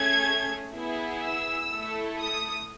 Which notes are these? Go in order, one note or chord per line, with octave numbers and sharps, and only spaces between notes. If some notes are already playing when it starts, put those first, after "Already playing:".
Already playing: A3 C#4 G#4 G#6
B3 E4 G#4
E6
A3 E4 A4
D#6